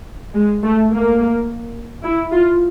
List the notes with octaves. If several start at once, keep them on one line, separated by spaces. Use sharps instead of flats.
G#3
A3
A#3
E4
F4